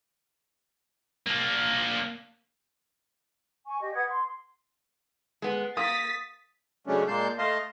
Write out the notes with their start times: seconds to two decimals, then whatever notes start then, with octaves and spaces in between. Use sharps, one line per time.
1.27 A#3 D4
3.66 G#5 C#6
3.82 G4 D#5
3.94 B4 F#5 D#6 G#6
4.10 C6
5.42 G#3 B3
5.77 A#3 D#6 A6 B6
6.87 C#3 F#3 G#3 A3 C#4 D4
7.08 A#2 G#3 A#3 A5 C6 G6
7.38 A3 D#5 F5 A5 C6